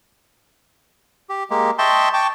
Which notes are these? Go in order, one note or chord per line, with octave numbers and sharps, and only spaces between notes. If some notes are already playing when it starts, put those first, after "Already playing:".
G4
G#3 A#3 G4
D#5 E5 G5 A5 C6 C#6
G5 A5 C#6 D6